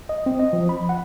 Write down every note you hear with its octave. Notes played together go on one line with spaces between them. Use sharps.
D#5
C4
D#5
F3
B5
F#5